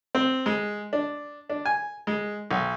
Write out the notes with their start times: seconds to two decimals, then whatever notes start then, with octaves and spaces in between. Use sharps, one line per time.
0.15 C4
0.46 G#3
0.93 D4
1.50 D4
1.66 G#5
2.07 G#3
2.51 B1